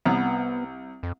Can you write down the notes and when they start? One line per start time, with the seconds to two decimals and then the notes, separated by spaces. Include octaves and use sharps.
0.05 C2 B3
1.03 F2